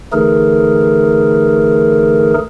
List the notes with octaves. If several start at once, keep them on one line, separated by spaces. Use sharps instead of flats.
D3 E3 A3 D#4 G#4 A#4